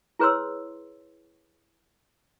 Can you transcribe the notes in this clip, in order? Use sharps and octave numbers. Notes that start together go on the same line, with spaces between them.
E4 G#4 B4 C#5 C6 E6